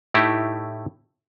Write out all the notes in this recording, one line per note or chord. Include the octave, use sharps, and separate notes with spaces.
A2 A3 D#4 E4 G4